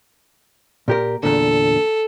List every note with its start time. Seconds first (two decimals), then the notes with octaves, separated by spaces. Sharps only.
0.88 A#2 G4 A#4
1.23 E2 A#2 D3 A4